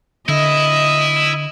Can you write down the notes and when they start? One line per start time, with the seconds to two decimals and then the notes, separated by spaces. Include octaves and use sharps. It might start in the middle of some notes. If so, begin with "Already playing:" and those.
0.29 D3 E4 D#5